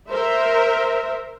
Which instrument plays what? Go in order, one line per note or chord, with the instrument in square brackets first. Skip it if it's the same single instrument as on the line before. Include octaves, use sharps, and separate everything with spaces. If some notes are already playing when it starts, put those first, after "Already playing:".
[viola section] A#4 C5 E5